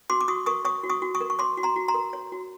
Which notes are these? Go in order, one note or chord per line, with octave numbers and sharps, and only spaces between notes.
F#4 C6 D6
D6
F#4 C#6 D#6
A#4 C#6 D#6
C#5 C#6 D#6
F#4
C#6 D#6
F#4
C#6 D#6
A#4
C#6
C#5 C6 D6
F#4
A#5 C6
F#4
A#5 C6
A#4
C#5
F#4